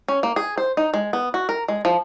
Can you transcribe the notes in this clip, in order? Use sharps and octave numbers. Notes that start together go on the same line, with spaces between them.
C#4
A#3
G#4
C5
D#4
G#3
B3
F#4
A#4
G#3
F3